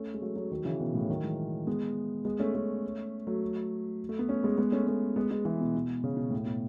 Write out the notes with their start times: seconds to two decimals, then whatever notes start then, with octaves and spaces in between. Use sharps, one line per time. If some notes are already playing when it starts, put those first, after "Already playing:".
Already playing: A3 C#4
0.14 G#3
0.21 F#3 A3
0.36 F#3 A3
0.51 D#3 F#3
0.65 C#3 E3
0.79 B2 D#3
0.94 A2 C#3
1.09 D#3 F#3
1.23 E3 G#3
1.67 G#3 B3
2.25 G#3 B3
2.40 A3 C#4
2.55 A3 C#4
3.27 F#3 A3
4.09 A3
4.19 B3
4.29 A3 C#4
4.44 G#3 B3
4.58 G#3 B3
4.72 A3 C#4
4.87 A3 C#4
5.16 G#3 B3
5.30 G#3 B3
5.45 E3 G#3
5.61 B2
5.75 B2
6.04 C#3
6.17 B2
6.30 A2
6.45 B2